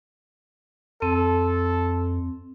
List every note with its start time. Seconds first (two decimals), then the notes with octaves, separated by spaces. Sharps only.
1.02 F2 C4 A4